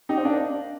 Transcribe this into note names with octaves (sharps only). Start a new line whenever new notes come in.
D#4 G4
C4
A#3 D4